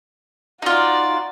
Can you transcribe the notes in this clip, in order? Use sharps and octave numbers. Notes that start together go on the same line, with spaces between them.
D#4 F4 F#4 D5